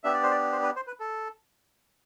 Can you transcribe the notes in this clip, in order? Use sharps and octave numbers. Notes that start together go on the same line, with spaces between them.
B3 D4 G4 E5
D5
C5
D5
C5
B4
C5
B4
A4